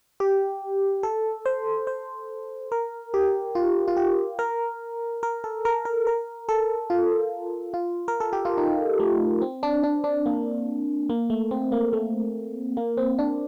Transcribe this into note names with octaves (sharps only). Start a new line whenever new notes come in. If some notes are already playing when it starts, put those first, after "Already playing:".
G4
A4
C5
C5
A#4
G4
F4
F4
G4
A#4
A#4
A4
A#4
A#4
A#4
A4
F4
F4
A#4
A4
G4
F4
D#4
A3
C4
D4
D4
D4
A#3
A#3
A3
C4
A#3
A3
A#3
C4
D4